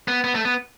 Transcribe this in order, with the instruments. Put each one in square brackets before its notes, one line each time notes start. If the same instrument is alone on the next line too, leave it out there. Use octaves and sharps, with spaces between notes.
[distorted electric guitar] B3
B3
A3
B3